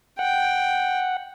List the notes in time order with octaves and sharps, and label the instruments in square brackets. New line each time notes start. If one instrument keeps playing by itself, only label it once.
[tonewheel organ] F#5 [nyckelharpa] G5